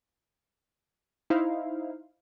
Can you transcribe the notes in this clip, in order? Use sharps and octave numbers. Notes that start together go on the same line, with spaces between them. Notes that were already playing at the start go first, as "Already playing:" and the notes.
D#4 E4 C5 F5